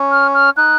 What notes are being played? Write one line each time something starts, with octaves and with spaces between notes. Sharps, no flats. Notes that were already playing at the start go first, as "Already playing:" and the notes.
Already playing: C#4
F6
F6
D#4 F#6